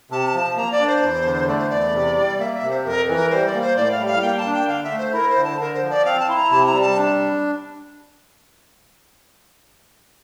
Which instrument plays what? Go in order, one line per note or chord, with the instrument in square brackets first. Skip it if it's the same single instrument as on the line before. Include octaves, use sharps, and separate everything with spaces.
[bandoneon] C3 [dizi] A5
[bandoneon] F3
[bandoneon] A#3 [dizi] A#5
[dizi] D5
[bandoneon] D4
[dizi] C5
[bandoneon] E2
D3
[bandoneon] A3 [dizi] D5
[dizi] C5
[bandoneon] E2 [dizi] D5
[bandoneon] C3
G3
[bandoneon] A#3 [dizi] E5
[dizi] E5
[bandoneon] C3
[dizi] C5
[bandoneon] F2 [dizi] A#4
[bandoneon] E3
[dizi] A#4
[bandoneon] G3 [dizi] C5
[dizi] D5
[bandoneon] A#3
[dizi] C5
[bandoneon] A2 [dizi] D5
[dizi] F5
[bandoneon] G3
[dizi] F5
[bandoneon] A#3 [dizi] G5
[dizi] A5
[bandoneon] D4
[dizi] G5
[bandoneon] D3 [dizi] F5
[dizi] E5
[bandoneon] A3
[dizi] C5
[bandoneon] E4 [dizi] A#4
[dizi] C5
[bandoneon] D3
[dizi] A5
[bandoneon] D3 [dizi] A#4
[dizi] C5
[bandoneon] F3
[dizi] D5
[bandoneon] C4 [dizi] F5
[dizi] A5
[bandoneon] E4 [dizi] C6
[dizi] A#5
[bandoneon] C3 [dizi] A5
[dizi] A#5
[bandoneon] G3
[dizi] A5
[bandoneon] D4